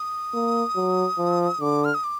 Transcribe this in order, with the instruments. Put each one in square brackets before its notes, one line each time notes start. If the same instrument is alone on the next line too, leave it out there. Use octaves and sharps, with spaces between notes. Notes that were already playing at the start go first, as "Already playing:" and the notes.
Already playing: [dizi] D#6
[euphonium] A#3
F#3
F3
[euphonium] D3 [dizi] D6
[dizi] F6
D#6
D6